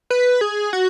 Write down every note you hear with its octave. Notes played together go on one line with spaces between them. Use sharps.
B4
G#4
F#4